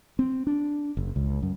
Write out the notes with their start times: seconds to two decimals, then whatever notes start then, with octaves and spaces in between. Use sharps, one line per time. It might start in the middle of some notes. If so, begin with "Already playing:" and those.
0.19 C4
0.47 D4
0.97 F#1
1.16 C#2
1.42 F#2